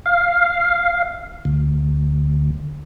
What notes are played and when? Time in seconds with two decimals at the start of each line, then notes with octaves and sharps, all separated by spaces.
0.06 F5
1.45 D2